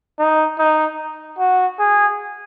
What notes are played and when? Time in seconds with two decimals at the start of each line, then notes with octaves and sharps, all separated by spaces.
0.19 D#4
0.58 D#4
1.38 F#4
1.79 G#4